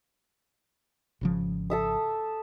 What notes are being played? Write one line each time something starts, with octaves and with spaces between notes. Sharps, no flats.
G#1 C#3 F3
A4 E5 D#6